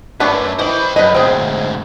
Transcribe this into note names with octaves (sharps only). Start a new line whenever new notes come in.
F#2 A3 D4 B4
D#3 E3 C5 B5
F#2 B4 D#5
D2 G#2 C4 G#4